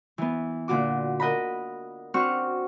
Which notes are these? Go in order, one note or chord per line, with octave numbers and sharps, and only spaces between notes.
E3 B3
A#2 D3 F4 F#4 D6
A#4 D#5 F#5 A#5 B5
C4 D4 F#4 C#6 F6